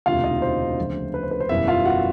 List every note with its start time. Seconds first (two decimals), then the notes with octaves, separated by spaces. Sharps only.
0.06 E1 D2 C3 F4 F5
0.24 D#4 D#5
0.42 C5
0.79 D2 C#3 F3
1.14 B4
1.23 C5
1.31 B4
1.40 C5
1.49 F#1 E2 B2 G3 E4 E5
1.67 F4 F5
1.85 F#4 F#5